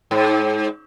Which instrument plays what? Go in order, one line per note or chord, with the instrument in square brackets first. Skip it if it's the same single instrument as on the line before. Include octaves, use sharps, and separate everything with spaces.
[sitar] G#2